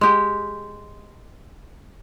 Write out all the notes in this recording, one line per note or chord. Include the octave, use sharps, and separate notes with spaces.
G#3 G4